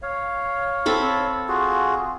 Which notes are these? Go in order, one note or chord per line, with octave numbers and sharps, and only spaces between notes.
C#5 F5
C4 A4 B5
F4 F#4 G#4